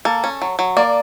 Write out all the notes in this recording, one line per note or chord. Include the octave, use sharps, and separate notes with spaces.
A#3 A4
C#4
F#3
F#3
A#3 D5